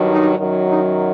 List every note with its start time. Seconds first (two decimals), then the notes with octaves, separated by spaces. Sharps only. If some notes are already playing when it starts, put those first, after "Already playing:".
Already playing: G2 D#3 F#3
0.08 D#4
0.37 F#2 D#3 F#3
0.66 D#4